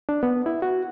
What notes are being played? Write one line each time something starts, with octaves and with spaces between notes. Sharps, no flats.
D4
B3
E4
F#4